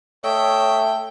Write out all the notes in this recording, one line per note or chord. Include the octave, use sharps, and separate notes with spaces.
A3 C#5 D#5 E5 G5